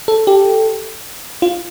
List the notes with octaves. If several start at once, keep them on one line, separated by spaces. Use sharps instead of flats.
A4
G4
F4